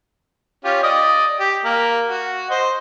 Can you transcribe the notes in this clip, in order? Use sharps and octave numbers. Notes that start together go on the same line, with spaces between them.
C#4 F4 G4
D5 D#5 D#6
G4
A#3
F#4
C5 D#5